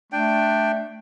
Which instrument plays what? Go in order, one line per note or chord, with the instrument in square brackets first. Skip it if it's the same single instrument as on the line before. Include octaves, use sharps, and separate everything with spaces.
[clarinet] A3 [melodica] D4 G5